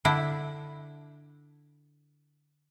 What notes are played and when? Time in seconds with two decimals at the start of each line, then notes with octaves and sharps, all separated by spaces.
0.05 D3 D4 E4 G5